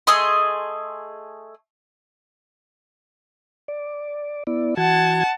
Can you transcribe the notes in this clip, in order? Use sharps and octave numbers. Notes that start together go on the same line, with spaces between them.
A3 G#4 D#5 C6
D5
B3 E4 D5
E3 F#4 F#5 A5 G#6